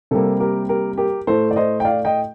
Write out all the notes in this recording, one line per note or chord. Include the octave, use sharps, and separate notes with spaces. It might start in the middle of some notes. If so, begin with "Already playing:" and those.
C3 G3 A#3 A4
G4 A#4
G4 A#4
G4 A#4
A2 A3 A4 C5
D5
C5 D#5
G5
D5 F5
D#5 G5